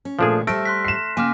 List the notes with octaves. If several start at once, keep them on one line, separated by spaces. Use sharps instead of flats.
C#4
A#2 F3 A3 D4 G#4
G3 A3 C5 E5 F6 A#6 D7
C6 F#6 B6
C7 E7
C#3 A#3 G5 G#5 D6 F6